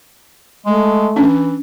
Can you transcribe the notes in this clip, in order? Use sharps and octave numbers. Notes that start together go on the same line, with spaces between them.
G#3 A3
E3 C#4 D4